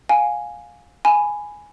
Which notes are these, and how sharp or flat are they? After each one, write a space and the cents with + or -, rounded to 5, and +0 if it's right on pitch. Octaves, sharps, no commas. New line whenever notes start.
F5 +20 G#5 +0
G#5 +0 B5 +5